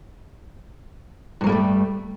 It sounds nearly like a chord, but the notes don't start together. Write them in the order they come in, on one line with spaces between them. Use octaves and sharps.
G2 F#3 A#3 G3 A3